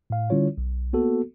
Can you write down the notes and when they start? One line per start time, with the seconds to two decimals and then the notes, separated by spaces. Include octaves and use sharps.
0.10 A2 F5
0.30 D3 G3 C#4 E4 F4 C#5
0.58 B1
0.93 A#3 B3 F#4 A4